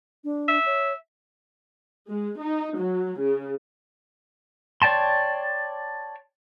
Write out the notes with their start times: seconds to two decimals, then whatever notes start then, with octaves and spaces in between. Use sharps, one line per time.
0.24 D4
0.48 E5
0.66 C#5
2.08 G#3
2.40 D#4
2.79 F#3
3.21 C#3
4.82 C#5 D5 G5 A5 C6